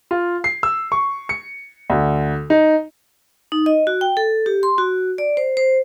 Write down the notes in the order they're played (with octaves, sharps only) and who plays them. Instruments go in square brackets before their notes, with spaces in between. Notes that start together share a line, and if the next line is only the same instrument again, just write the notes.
[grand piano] F4
C7
E6
C#6
C#7
D2
D#4
[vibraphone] D#4
D#5
F#4
G5
A4
G4
C6
F#4
D5
C5
C5